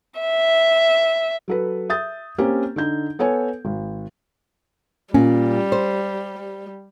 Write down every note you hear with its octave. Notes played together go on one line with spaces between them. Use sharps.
E5
F#3 A4 B4
E5 D#6 G6 A6
A#3 C4 C#4 G4
D3 D#4 G6
B3 A4 C#5 G#5
G#1
A#2 G3 C#4
C5